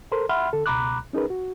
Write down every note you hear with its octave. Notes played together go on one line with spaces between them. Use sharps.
A4 A#4 C5 C6
E5 F#5 B5 C6 F6
D3 A4
C#2 B2 A#5 B5 D6 F#6
C#4 D#4 G#4 A#4 B4
F#4